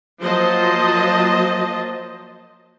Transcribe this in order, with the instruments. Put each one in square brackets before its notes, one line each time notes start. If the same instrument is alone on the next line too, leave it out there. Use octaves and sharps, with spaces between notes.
[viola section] F3 F#3 A#3 C5 D#5 A5